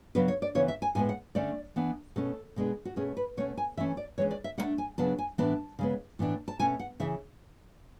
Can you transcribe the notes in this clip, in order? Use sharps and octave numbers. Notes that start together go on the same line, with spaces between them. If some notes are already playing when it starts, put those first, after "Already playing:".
C#3 F#3 B3 D4 B4
C#5
D5
C#3 E3 B3 C#5
E5
G#5
A2 G#3 B3 G#5
F#5
D3 A3 C#4 D5
E3 B3 D4
B2 A3 C#4 A4
B2 G#3 B3 D4
F#4
B2 A3 C#4 G#4
B4
B2 A3 C#4 C#5
G#5
E3 A3 C#4 E5
D5
E3 G#3 C#4 C#5
D5
E5
D3 A3 D4 F#5
G#5
C#3 F#3 B3 D4 A5
G#5
A2 E3 B3 D4 A5
C#3 G#3 B3
A2 E3 B3 D4
A5
B2 A3 C#4 G#5
F#5
C#3 E3 E5